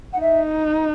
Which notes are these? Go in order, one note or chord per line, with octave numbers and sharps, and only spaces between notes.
F#5
D#4 E5